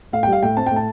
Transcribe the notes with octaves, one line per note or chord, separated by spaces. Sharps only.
A2 F5
G5
G3
F5
A2 G5
C4 A5
A2 G5
A5